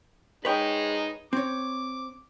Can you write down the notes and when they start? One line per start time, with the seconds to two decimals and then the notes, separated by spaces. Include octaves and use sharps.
0.45 G#3 D#4 G#4 B4 C#5 G5
1.33 C4 C#5 D6